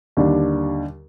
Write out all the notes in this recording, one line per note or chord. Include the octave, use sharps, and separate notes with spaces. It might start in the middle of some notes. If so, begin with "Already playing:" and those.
D#2 D3 G3 D4